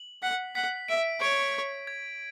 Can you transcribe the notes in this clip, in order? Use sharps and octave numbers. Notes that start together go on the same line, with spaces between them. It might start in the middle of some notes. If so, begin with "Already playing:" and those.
Already playing: F#7
F#5 B6
F#5 B6
E5 D7
C#5 D7
G#6
G#6